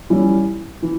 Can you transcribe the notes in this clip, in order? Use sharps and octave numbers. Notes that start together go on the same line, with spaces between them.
E3 G3 C#4 E4
E3